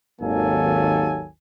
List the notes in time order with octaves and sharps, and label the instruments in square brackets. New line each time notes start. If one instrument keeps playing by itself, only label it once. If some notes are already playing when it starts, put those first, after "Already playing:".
[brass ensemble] G#1 D#2 F#3 A#3 A4 G#5